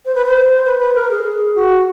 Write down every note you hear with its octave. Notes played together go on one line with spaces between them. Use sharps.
C5
B4
C5
B4
B4
A#4
G#4
F#4